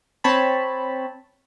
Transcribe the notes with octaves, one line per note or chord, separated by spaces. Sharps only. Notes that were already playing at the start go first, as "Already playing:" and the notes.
C4 C#5 A5 B5